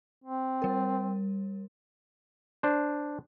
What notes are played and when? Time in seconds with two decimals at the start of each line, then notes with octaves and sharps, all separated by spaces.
0.24 C4
0.62 G3 A#4
2.63 D4 C5